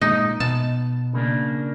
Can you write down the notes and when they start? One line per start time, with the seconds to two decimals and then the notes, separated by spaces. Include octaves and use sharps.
0.02 A#2 G#3 A#3 D#4 D#5
0.40 B2 B3 A5
1.13 C#3 A#3 D4